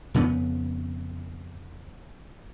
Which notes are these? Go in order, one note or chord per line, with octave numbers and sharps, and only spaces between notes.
F2 C#3 B3